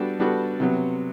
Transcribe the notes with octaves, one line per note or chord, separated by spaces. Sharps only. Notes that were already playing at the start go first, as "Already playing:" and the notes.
Already playing: G3 B3 D4 F#4 A4
G3 B3 D4 F#4 A4
C3 F#3 B3